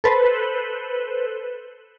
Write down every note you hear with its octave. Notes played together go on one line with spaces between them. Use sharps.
A4 B4 C5